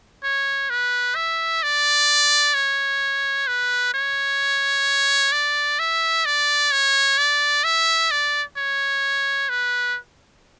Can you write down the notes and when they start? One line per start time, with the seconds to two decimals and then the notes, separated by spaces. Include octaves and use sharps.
0.24 C#5
0.70 B4
1.15 E5
1.63 D5
2.54 C#5
3.48 B4
3.94 C#5
5.32 D5
5.79 E5
6.25 D5
6.72 C#5
7.18 D5
7.64 E5
8.11 D5
8.57 C#5
9.49 B4